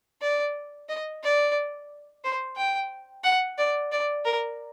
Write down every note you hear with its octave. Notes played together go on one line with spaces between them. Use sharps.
D5
D#5
D5
C5
G5
F#5
D5
D5
A#4